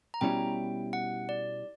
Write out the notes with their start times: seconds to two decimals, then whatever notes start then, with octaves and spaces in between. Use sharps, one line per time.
0.14 A#5
0.21 B2 G3 C#4 E4 G5
0.93 F#5
1.29 D5